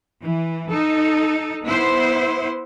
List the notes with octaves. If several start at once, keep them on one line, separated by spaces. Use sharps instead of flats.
E3
D#4 A4
B3 E4 C5